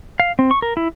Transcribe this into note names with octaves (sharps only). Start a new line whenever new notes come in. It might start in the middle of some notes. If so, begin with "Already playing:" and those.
F5
C4
C#6
A#4
E4